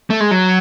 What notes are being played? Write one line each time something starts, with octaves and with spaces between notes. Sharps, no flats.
A3
G#3
F#3